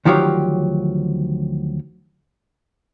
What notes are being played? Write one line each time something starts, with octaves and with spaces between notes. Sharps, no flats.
D2 D#3 F3 F#3 G4 C#5